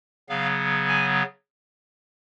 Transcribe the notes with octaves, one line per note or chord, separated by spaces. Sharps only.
C#3 F#3 B3 F5
G#5